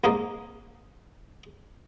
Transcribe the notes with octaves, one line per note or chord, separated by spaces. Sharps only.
C2 G#2 A#3 D#4